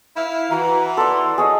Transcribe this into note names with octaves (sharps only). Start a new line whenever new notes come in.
E4 F5
E3 F#4 A#5
A4 D5 C6
G#4 C#5 D#5 D#6